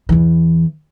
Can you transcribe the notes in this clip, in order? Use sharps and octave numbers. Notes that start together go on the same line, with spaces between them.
E2 E3